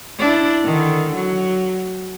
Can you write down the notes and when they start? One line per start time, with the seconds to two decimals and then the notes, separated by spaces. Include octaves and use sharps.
0.19 D4 E4
0.64 D3 D#3
1.15 F#3